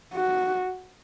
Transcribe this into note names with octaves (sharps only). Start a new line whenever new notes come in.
F#4